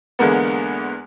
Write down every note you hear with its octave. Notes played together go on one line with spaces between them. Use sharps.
E2 D3 G#3 A#3 B3